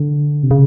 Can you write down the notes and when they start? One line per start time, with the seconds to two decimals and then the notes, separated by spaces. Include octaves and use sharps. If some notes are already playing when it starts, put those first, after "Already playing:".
Already playing: D3
0.43 C3
0.51 C#3